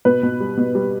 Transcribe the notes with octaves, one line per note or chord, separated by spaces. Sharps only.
B2 B4
B2
G3
B2
G3